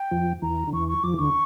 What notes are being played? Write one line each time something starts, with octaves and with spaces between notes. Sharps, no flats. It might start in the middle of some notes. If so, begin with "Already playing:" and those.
Already playing: G5
F2 F3
E2 E3 A#5
D3
E2 E3 C#6
C#6
F2 F3 D6
E3
D2 D3 C#6